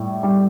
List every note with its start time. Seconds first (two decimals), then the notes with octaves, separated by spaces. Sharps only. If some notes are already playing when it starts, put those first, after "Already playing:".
Already playing: A2 G3
0.23 G3